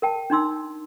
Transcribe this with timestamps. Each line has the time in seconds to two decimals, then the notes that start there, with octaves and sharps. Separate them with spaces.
0.02 A#4 G5 A5
0.30 D4 D#4 C6 E6